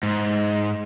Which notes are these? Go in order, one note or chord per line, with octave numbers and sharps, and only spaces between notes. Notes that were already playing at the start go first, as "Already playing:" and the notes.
G#2